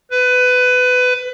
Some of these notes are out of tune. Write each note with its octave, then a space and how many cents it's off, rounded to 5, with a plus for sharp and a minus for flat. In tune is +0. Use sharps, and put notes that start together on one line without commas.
B4 +20